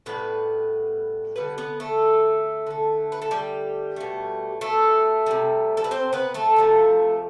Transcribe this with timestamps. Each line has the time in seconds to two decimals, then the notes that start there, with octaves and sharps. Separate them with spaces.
0.06 A2 G3 B3 B4
1.36 D3 G3 B3 B4
1.58 B3 B4
1.80 A3 A4
2.67 D3 A3
3.12 B4
3.22 A4
3.31 G3 G4
3.96 B2 A3
4.61 A3 A4
5.26 C3 G3
5.77 A4
5.84 B4
5.91 C4 C5
6.13 B3 B4
6.34 A3 A4
6.56 C3 F3 A3